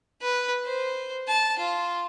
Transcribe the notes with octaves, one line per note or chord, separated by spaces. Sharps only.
B4
C5
A5
F4